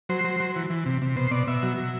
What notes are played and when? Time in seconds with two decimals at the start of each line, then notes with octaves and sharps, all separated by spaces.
0.09 F#3 C5
0.24 F#3
0.40 F#3
0.56 E3
0.70 E3
0.86 C3
1.02 C3
1.16 B2 C5
1.31 B2 D5
1.47 B2 E5
1.63 F#3
1.77 F#3